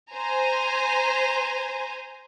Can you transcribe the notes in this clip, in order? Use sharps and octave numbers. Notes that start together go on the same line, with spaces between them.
C5 G#5 A#5